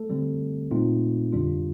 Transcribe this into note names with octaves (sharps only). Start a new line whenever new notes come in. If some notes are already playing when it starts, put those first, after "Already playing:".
Already playing: A3 A4
D3 G3 C4
A#2 A3 C4 D#4 F4
F2 D3 G3 D4 F4